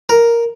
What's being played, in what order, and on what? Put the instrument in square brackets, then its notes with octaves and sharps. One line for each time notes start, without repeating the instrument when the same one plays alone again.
[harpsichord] A#4